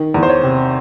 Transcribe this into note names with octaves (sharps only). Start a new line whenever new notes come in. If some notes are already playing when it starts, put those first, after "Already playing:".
Already playing: D#3
E2
C5
C#5
C3